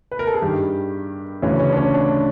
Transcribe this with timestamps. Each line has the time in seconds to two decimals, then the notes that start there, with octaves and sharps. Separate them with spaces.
0.11 B4
0.19 A#4
0.27 A4
0.34 G#4
0.42 G2 D#3 G4
1.42 D2 C#3 E3 C#4
1.60 C#4
1.72 D4
1.77 C#4
1.94 D4